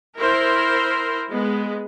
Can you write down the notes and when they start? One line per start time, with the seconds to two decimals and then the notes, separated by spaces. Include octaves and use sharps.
0.18 E4 A#4 C5
1.30 G#3 B3